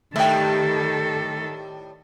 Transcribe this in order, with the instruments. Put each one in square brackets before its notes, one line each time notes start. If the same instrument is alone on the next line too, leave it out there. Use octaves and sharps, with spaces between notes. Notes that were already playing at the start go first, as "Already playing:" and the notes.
[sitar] A2 G3 [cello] D#3 A4 [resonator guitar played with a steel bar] A3 G5